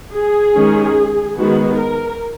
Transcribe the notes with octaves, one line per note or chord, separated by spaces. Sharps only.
G#4
D#3 G#3 C#4
D#3 G#3 B3 F#4
A#4